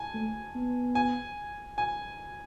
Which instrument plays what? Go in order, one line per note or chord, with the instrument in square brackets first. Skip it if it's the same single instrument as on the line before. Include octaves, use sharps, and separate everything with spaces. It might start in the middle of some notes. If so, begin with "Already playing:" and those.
Already playing: [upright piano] G#5 A5
[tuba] A3
B3
[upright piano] G#5
G#5